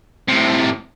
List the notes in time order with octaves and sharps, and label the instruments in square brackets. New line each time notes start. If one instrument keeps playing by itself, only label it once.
[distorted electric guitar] A2 C3